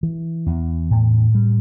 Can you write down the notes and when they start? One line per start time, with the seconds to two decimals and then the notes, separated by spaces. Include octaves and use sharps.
0.03 E3
0.46 E2
0.91 A2
1.35 G3